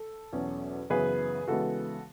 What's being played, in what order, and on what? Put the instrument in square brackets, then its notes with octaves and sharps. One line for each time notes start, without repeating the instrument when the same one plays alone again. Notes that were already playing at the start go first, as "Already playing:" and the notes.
Already playing: [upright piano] A4
E2 B2 F#3 C#4
F#2 C#3 E3 B3 G#4 B4
C#3 E3 G#3 B3 F#4 A4